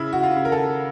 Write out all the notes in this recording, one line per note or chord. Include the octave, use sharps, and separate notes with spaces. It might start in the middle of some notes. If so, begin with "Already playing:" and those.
Already playing: C#3 E4
F#4
F4
C#3
A#4
A4